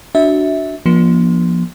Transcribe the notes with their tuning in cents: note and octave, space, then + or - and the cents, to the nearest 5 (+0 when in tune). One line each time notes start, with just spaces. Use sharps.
D4 +0 F#4 +0 E5 -20
F3 -10 A#3 +40 D4 +0